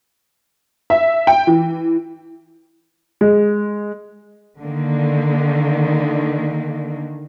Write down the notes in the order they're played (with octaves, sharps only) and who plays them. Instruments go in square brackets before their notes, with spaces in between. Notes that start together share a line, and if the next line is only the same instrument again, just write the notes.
[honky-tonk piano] E5
G5
E3
[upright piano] G#3
[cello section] D3 D#3 A#3